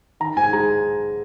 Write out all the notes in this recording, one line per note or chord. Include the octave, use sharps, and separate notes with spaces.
D#3 A#5
G#2 G#5
G#3 A#5